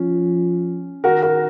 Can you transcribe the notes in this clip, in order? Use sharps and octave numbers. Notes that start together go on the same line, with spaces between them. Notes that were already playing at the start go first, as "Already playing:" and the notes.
Already playing: F3 C#4
D#3 F#4 A#4
F#4 A#4